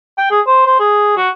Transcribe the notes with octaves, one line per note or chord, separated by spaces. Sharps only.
G5
G#4
C5
C5
G#4
F#4